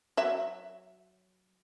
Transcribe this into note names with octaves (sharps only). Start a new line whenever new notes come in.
F#3 E5